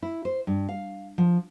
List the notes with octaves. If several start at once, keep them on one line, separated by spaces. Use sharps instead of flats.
E4
C5
G2
F5
F3